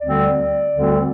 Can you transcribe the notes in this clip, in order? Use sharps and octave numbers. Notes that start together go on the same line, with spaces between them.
D2 D3 G3 C4 D5
D2 D3 G3 C4